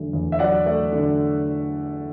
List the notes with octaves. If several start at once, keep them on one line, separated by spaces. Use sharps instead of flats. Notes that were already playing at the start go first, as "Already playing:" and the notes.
Already playing: E2 D3 F#3 A3
E2
E5
F#3 D5 F#5
A3
D3